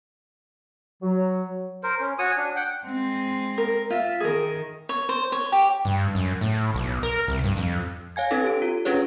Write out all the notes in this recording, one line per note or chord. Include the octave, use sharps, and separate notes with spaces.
F#3
A#4 C5
C#4
F#4 C#5 G#5 D#6
D4
F#5 G5
G#3 C4
A#4
F4 E5
D#3 G#4 A#4
C#5
C5
C#5
G4
G2
F#2
A2
B1
A#4
C2
G2
F2
C#5 F5 G#5 G#6
C4 D4 E4 A4 B4
G4 D7
F4
C#4 D4 F4 G#4 B4 C#5